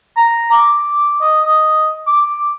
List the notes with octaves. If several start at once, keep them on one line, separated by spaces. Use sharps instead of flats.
A#5
D6
D#5
D#5
D6